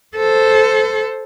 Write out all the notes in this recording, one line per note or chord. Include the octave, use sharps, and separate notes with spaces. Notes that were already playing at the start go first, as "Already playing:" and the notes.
A4 C5